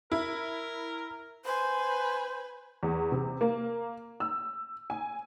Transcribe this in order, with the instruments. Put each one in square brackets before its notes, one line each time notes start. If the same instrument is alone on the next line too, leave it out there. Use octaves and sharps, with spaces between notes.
[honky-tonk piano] E4 [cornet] A#4
[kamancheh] B4 G#5 [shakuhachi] C5
[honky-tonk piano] E2
C3
A#3
E6
G#5